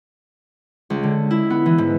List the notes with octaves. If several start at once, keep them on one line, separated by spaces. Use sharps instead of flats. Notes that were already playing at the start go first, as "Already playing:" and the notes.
C#2
D3
E4
B3
E3
G#2